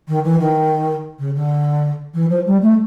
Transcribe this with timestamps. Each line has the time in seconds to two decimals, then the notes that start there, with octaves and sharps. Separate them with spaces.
0.08 D#3
0.24 E3
0.39 D#3
1.19 C#3
1.35 D3
2.14 E3
2.30 F3
2.46 G3
2.62 A3